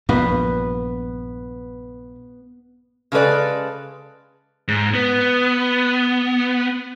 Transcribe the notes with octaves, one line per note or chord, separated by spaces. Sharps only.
A#1 G2 A#2 B3
C#3 G#3 A4 B4 D5
G#2
B3